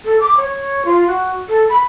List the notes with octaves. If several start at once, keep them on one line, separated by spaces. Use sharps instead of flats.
A4
D6
C#5
F4
F#4
A4
B5